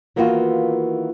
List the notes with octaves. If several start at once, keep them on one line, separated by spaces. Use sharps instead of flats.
D#3 E3 A#3 B3 F4 F#4